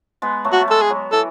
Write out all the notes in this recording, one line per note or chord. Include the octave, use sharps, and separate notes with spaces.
G#3 B3
F#3 A3
F#4
A3
G#3 A4
G#4
F#3
E3 A4